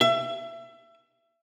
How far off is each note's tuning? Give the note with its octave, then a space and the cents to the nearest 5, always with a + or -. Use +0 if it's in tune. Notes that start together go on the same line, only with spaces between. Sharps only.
E5 +30